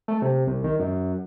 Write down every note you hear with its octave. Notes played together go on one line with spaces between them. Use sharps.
A3
C3
C2
D#3
F#2